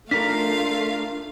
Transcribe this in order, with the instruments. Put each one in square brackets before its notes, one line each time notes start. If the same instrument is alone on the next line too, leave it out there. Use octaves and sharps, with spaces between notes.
[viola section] A3 F4 [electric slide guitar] D4 A#4 [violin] F5 [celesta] B6